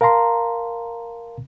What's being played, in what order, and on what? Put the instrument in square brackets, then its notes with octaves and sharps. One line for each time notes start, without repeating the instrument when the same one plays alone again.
[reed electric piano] A#4 F5 A5 A#5 C6